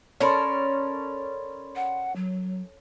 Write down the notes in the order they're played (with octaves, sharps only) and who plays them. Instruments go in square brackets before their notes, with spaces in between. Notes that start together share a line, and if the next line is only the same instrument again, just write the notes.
[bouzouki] C#4 A4 A#4 [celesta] D5 B5 C6
[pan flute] F#5
F#3